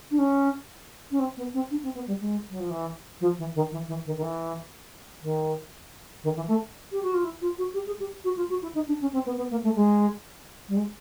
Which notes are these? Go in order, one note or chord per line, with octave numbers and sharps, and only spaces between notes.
D4
C#4
C#4
C4
B3
C4
D4
C4
B3
G3
G#3
F#3
F3
E3
F3
E3
D#3
E3
E3
D#3
D#3
E3
D#3
D#3
E3
A3
G4
F#4
F4
E4
F4
F#4
G4
G#4
G4
F#4
F4
F#4
E4
D#4
D4
C#4
C4
B3
B3
A#3
A3
G#3
G3
G#3